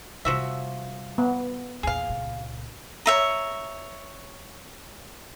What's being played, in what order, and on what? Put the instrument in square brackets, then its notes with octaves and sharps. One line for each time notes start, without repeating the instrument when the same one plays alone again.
[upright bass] C3 G3 [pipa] F3 F#4 E5
[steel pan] B3
[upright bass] E2 A#2 [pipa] G#4 F5
[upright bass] C#2 A#2
[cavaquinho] C#5 E5 A#5